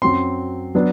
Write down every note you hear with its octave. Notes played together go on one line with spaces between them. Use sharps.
F#2 F#3 C4 C6
F#3 B3 D4